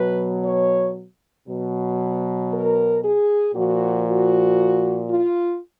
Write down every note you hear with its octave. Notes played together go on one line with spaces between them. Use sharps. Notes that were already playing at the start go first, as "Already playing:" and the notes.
Already playing: B2 F#3 B4
C#5
B2 F#3
A#4
G#4
A#2 F3 F#4
F#4
F4